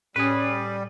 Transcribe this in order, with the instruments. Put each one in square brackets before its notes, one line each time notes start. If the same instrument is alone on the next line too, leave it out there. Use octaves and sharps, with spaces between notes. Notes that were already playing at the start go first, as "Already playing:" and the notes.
[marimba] A2 [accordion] G3 [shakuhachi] C#4 [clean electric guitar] G#4 B4